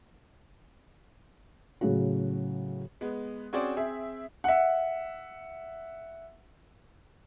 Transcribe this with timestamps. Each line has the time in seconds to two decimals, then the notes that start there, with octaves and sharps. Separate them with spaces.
1.81 A2 C#3 F#3 F#4
3.01 G#3 B3
3.53 C4 C#4 F#4 G#4 C5 D5
3.76 C4 G#4 E5
4.44 E5 F#5